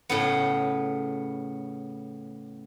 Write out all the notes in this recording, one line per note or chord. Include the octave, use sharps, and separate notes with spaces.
A2 C#3 B3